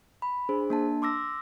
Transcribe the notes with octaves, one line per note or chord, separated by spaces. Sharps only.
B5
D4 G#4 C5
A#3 D4 A5
C6 D6 E6 A#6